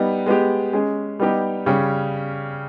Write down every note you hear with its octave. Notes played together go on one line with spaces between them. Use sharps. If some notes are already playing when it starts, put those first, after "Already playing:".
Already playing: G3 B3 D#4
G#3 B3 G4
G#3 C#4 G#4
G3 B3 D#4 G4
C#3 G3 C#4